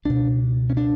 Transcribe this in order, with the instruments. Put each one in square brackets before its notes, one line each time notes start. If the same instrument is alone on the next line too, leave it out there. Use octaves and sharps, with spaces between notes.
[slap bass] C#2 B2 D4
C#4
D4